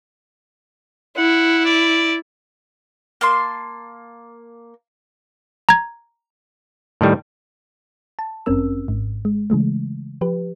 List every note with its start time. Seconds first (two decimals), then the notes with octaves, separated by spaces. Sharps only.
1.18 E4 F#5
1.65 D5
3.21 A#3 A5 C6
5.69 A#5 G#6
7.01 A2 D#3 G3
8.19 A5
8.46 G1 F#2 C4 C#4 A#4 E6
8.88 G#1 G#2
9.25 G#3
9.50 C#3 E3 G#3 A3
10.21 F3 G4 B4